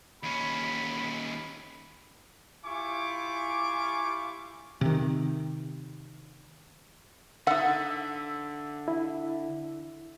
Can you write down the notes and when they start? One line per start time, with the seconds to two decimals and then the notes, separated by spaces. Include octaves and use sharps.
0.23 D#2 C#4 B5
2.65 E4 F4 G4 G#5 C#6 D6
4.81 C3 D#3
7.47 D3 D#4 E5 F#5
8.88 E4